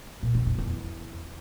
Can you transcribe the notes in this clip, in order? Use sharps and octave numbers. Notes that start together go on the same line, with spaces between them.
A#2
D#3
F2
E2